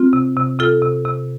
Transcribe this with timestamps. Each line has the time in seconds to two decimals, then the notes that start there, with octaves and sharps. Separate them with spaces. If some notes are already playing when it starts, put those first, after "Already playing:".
Already playing: C4 F4
0.13 C3
0.37 C3
0.59 C3 F4 A4
0.82 C3
1.05 C3